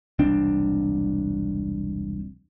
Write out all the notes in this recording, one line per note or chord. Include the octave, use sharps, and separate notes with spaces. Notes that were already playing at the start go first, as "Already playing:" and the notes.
E1 C2 C4 D4